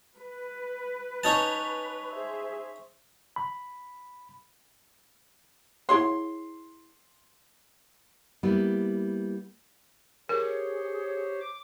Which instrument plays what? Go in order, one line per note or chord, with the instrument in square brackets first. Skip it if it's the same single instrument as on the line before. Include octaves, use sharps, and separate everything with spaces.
[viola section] B4
[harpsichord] C#4 D#4 A5
[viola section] G#4 C5 E5
[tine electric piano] B5
[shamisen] E4 G#4 C#5 [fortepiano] C6
[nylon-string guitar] G3 A#3 B3 E4
[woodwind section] G4 C5 C#5 [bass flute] G#4 [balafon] A#4
[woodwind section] D6